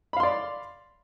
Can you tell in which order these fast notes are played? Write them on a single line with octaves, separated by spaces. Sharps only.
B5 F5 C6 D5